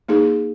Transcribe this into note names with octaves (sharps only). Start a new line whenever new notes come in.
A#3 D#4 G#4